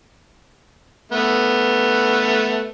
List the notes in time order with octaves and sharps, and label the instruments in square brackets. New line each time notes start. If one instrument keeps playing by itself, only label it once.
[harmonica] A3 B3